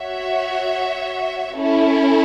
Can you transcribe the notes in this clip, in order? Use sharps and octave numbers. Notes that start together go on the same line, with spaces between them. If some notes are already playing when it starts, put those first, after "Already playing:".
Already playing: F#4 C#5 E5
C#4 E4 A4